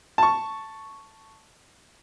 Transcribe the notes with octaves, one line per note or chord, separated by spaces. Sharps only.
A5 C#6